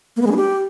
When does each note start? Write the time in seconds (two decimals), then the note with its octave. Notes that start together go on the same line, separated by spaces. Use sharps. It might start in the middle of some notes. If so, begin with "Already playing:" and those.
0.16 A#3
0.21 B3
0.26 G#3
0.31 D4
0.36 G4